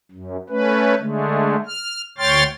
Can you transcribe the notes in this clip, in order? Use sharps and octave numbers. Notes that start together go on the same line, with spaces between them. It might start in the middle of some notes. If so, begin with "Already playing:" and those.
F#2
A3 C#4 B4
D3 G#3 A3
F6
D2 C#5 G5 C6 F6 A6